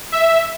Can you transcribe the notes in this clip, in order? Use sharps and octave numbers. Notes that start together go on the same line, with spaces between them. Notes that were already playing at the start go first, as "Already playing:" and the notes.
E5